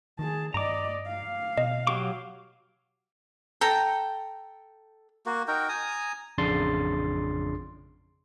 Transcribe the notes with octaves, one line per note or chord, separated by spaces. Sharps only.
D#3 G#4 A5
G2 D5 D#5 A#5 D6
F5
B2 D#5
F#3 G4 C#6 D6
A4 G5 A#5
A#3 F#4
D#4 F#4 A#4 G5
G#5 A#5 D#6
A1 F2 C#3 D4 C6 A6